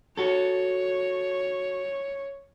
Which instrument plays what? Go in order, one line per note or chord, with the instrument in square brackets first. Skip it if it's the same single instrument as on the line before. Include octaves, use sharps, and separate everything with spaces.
[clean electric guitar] F#4 A4 [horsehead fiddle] C#5